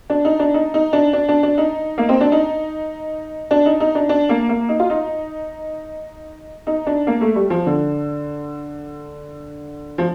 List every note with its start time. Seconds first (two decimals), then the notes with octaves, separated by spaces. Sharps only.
0.10 D4
0.25 D#4
0.39 D4
0.54 D#4
0.74 D#4
0.93 D4
1.13 D4
1.29 D4
1.43 D4
1.58 D#4
1.98 A#3
2.09 C4
2.21 D4
2.32 D#4
3.51 D4
3.66 D#4
3.80 D#4
3.95 D4
4.09 D4
4.29 A#3
4.49 A#3
4.69 D#4
4.80 F4
4.90 D#4
6.67 D#4
6.86 D4
7.07 A#3
7.21 A3
7.35 G3
7.50 F3
7.66 D3
9.98 F3